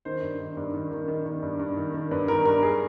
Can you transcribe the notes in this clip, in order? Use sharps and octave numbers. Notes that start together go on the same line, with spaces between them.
D#3 C5
G2
D#3
G2
D#3
D#3
D#3
D#3
G2
G2
D#3
D#3
G2 B4
D#3 A#4
G2 A#4
G#4